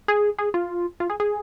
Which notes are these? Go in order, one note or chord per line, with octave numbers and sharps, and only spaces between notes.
G#4
G#4
F4
F4
G#4
G#4